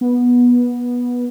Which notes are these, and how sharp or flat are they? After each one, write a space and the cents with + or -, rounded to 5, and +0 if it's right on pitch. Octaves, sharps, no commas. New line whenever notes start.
B3 -15